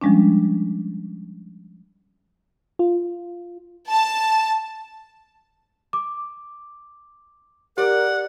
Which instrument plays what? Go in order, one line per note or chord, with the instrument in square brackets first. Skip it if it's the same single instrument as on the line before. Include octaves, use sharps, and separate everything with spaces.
[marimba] F3 G3 G#3 C#4 D4
[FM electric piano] F4
[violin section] A5
[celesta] D6
[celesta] G4 [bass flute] A#4 [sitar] D5 [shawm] F#5